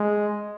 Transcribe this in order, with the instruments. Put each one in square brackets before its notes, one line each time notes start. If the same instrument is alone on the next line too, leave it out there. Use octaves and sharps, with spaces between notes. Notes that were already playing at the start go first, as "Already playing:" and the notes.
Already playing: [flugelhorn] G#3